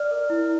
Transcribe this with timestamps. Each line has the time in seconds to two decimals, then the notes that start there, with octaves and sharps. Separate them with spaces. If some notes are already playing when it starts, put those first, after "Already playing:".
Already playing: D5 F6
0.11 A#4
0.30 E4